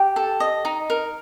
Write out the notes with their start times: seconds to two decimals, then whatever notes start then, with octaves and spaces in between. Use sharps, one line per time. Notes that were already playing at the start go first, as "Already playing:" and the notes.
Already playing: G4 G5
0.16 A4
0.40 D#5
0.65 D#4
0.90 A#4